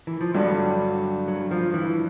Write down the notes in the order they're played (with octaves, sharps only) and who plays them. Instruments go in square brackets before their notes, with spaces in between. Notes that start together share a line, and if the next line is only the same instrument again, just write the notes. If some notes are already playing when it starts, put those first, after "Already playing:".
[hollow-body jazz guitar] E3
F3
[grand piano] G2 D3 G3 [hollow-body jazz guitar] F#3
[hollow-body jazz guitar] F#3
F3
E3